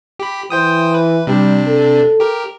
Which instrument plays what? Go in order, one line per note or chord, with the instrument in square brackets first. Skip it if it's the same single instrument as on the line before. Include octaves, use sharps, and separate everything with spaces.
[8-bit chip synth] G4 B5
[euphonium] E3 [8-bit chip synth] C5 G5 D#6
[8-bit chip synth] B4
[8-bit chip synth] C3 D4 [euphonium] G3
[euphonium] A4
[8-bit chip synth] G4 A#4